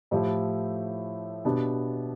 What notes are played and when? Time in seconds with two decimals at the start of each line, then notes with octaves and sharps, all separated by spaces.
0.11 A2 F3 A3 E4 G4
1.45 B2 B3 D4 G4